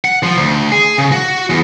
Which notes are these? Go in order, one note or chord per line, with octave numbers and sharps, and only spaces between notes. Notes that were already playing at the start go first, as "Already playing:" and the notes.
F#5
F3
D2
G#4
C#3
F#4
E2